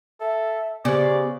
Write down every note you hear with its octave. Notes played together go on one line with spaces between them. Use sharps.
A4 E5
C#3 B3 G4 C5 D5